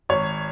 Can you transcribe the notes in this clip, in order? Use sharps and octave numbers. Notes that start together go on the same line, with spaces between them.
G#1 C#5